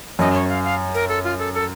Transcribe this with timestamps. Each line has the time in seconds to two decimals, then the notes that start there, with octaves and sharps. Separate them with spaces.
0.19 F#2 D#5
0.35 C#5
0.49 F5
0.64 F5
0.94 A#4
1.09 A4
1.24 F4
1.39 A4
1.54 A4